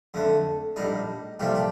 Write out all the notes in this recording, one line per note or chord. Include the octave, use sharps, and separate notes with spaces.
F2 D3 A3
A#1 A2 G3 D#4
C2 A#2 F3 A3 G4
G4